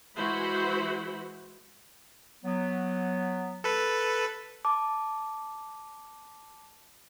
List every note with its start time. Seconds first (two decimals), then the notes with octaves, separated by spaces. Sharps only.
0.16 E3 G#3 E4 F#4 C5 B5
2.45 F#3 B3
3.64 A4 B4
4.65 A5 D6